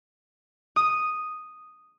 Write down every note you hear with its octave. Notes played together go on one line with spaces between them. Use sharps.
D#6